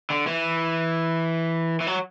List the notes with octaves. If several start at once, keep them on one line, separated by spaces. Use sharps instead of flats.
D3
E3
E3
F#3